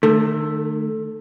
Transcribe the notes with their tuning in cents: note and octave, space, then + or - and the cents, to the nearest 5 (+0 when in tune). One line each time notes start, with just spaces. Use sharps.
D#3 -45 A3 +0